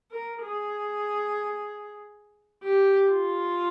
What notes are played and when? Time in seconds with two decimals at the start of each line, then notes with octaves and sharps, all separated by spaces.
0.11 A#4
0.43 G#4
2.63 G4
3.10 F4